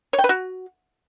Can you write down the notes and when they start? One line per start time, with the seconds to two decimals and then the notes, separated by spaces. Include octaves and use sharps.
0.13 C#5
0.19 G5
0.24 B4
0.29 F#4